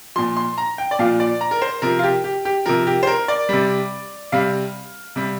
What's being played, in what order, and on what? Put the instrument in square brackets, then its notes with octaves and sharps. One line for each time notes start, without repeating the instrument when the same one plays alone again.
[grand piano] A#2 F3 C6
C6
A#5
G5
D5
A#2 F3 F5
D5
A#5
A#4
C5
C3 F3 A#4
F4
G4
G4
G4
C3 F3 A#4
G4
C5
A#4
D5
C3 G3
C3 G3 F5
C3 G3